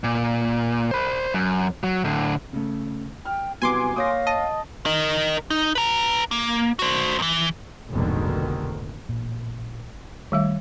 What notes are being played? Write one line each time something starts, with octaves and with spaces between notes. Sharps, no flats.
A#2
C5 B5
F#2
F#3
A2 D3
C#3 A3
G5 F6
C2 F#3 B3 G#5 C6 D6
A#3 C#5 F5 D#6 A#6
D#5 A5
A#4 D#5
D#4
B4 A#5
A#3
F#4 C5
E2 E3
F1 A#1 G#2 B2 D3 D#3
A1 A#2
D#3 G3 A3 E5